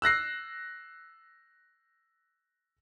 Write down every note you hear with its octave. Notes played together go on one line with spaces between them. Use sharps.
E6 F#6 A#6 C7